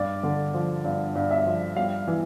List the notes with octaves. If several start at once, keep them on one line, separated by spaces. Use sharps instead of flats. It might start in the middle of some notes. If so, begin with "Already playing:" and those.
Already playing: G2 D5
D3
F3
G2
G2
E5
F3
G3 F5
E3